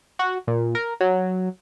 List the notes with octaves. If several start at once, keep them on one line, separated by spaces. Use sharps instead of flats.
F#4
A#2
A#4
F#3